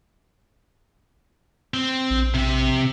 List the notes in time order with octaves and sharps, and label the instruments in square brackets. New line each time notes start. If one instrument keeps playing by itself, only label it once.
[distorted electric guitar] C4
[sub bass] A#1
[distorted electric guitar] C3 E5